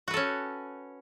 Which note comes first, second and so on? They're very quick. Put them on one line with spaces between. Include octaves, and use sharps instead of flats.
F#4 B4 A4 C#4